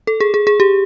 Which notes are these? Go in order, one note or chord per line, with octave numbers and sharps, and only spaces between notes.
A4
G#4
G#4
G#4
G4